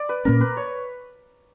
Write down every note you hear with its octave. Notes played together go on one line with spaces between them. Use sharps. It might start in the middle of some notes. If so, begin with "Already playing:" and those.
Already playing: D5
B4
A#2 A#3 C#4 A#4
B4
C#5